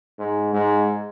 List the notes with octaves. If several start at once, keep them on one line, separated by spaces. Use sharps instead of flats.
G#2
G#2